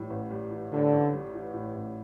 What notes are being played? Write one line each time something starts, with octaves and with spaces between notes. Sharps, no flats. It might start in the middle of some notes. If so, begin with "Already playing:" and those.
Already playing: A2 E3 G3
A1
G3
E3
A2 D3
A1
G3
E3
A2
A1